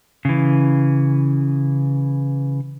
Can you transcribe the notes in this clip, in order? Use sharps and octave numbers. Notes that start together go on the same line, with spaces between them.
C#3 E3